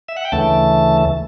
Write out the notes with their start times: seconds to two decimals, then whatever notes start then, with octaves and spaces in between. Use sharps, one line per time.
0.08 E5
0.17 F#5
0.25 G5
0.32 D2 C#3 E3 A3 A5